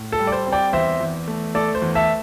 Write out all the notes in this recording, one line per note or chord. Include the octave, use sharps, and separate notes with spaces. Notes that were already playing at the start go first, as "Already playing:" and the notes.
Already playing: A2
A4
G3
D5
C5
C4
D5 G5
E2 C5 E5
E2
A3
A3 A4 D5
C5
E2
E5 A5